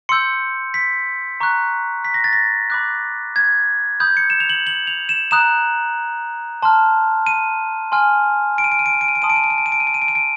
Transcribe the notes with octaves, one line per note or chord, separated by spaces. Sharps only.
C6 E6 G6 C#7
B6
A#5 C#6 F#6
B6
A#6
A6
A#6
B5 D6 F#6
G#6
B5 D#6 G6
C#7
E7
F7
F#7
F#7
F7
E7
A#5 D#6 F#6 E7
A5 C6 F6
D#7
G#5 C6 F6
D7
D#7
D7
D#7
D7
D#7
D7
D#7
D7
A5 C6 D#6 D#7
D7
D#7
D7
D#7
D7
D#7
D7
D#7
D7
D#7
D7
D#7
D7